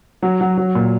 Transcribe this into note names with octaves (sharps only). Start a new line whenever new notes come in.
F#3
F#3
F#3
A#2